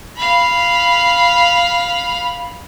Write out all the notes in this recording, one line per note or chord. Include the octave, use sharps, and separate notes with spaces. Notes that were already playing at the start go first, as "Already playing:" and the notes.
F5 B5